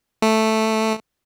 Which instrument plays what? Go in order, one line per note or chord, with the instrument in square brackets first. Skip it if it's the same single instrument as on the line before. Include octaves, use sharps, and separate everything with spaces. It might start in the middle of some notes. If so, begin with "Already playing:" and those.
[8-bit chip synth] A3